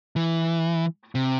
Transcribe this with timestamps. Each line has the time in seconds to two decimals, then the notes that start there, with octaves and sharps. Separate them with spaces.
0.16 E3
1.15 C3